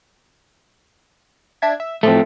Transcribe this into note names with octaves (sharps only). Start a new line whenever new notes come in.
D4 E5 G#6
E5
A2 F3 F#3 A3 C4